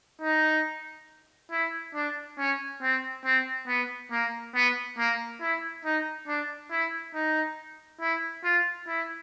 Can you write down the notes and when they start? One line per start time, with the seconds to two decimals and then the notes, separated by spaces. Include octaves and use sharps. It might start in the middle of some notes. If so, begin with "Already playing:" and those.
0.21 D#4
1.51 E4
1.95 D4
2.39 C#4
2.82 C4
3.25 C4
3.67 B3
4.11 A#3
4.55 B3
4.98 A#3
5.41 E4
5.85 D#4
6.28 D4
6.71 E4
7.15 D#4
8.01 E4
8.44 F4
8.88 E4